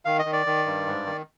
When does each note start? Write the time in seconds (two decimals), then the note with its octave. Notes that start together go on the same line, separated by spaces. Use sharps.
0.05 D#3 F5
0.19 D#5
0.25 D#3
0.33 D5
0.46 D#3
0.66 G2
0.86 G#2
1.06 D#3